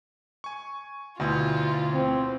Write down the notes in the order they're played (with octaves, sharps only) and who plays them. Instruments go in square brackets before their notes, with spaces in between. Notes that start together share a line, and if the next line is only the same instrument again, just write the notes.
[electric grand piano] G#5 C#6
[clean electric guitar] D2 [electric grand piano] B2 E4 [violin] F4
[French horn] C4